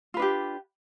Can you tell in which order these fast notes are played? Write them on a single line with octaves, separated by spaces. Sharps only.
F4 B4 D4 G4